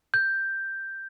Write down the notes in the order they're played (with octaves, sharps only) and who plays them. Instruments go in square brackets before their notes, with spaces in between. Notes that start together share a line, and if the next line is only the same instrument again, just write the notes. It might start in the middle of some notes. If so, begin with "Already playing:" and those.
[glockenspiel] G6